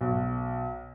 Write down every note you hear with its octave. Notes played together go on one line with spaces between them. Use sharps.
B1